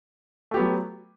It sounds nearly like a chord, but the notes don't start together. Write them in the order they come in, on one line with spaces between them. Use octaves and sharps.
A3 G4 B3 F#3